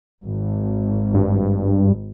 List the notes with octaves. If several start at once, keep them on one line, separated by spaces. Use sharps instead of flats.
G#1
G2